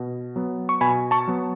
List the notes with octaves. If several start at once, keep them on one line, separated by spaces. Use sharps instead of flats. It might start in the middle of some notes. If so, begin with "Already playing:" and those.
Already playing: B2
F#3 B3
C#6
B2 G#5 B5
A5 C#6
F#3 B3